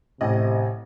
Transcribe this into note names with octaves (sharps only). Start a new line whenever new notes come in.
A1 C3 D#5